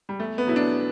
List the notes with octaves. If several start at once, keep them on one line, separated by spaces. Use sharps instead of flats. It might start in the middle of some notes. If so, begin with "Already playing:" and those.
G3
E2 A3
B3
B2 F#3 E4
D4